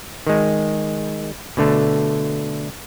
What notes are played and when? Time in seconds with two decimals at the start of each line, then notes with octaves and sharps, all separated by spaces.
0.27 D#3 G#3
1.57 B2 D3 A3